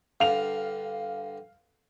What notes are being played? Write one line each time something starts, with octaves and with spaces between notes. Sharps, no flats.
G2 D3 F5 F7